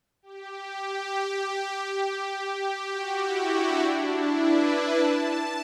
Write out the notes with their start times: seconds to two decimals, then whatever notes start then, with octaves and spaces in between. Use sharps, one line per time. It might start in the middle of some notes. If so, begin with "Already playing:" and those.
0.23 G4
2.59 G4
2.89 F#4
3.19 E4
3.49 D4
3.79 D4
4.08 E4
4.38 B4
4.67 A5
4.97 A5